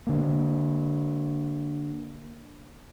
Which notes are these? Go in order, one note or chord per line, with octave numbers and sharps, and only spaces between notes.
D3 A#3